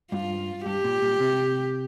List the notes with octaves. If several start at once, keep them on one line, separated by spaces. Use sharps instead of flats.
G2 F4
G2 G4
A#2
A#2
C3